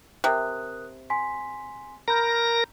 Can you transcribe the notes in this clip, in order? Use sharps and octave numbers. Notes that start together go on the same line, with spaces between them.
C3 A#4 D#6 F#6
G#5 C6 B6
A#4 A#5 B5 G6 A#6